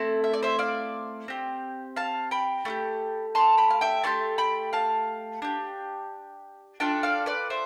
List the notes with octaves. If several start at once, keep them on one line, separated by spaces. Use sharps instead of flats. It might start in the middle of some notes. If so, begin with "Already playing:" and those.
Already playing: A3 C4 E4
E5
D5
C5 E5
D5 F5
C4 G4
F5 A5
G5 B5
A3 E4 G4
A5 C6
G5 B5
F5
E5 G5
A3 E4 G4 A5 C6
G5 B5
F5 A5
D4 G4
D4 F4 A4 E5 G5
D5 F5
B4 D5
C5 E5